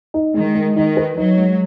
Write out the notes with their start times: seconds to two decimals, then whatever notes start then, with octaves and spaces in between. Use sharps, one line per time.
0.14 D#4
0.34 D#3 G#3
0.55 G#3
0.76 D#3 D#4
0.97 B4
1.17 F#3 D#4
1.37 G#3